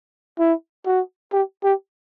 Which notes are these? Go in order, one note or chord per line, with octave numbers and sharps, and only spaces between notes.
E4
F#4
G4
G4